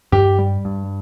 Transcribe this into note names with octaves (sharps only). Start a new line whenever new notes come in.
G2 G4
G3
G2